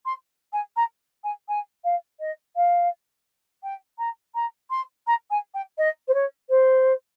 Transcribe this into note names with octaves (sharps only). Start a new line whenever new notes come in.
C6
G#5
A#5
G#5
G#5
F5
D#5
F5
G5
A#5
A#5
C6
A#5
G#5
G5
D#5
C5
C#5
C5